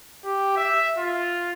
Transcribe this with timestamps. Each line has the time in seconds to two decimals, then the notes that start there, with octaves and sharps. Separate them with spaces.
0.25 G4
0.57 E5
0.98 F4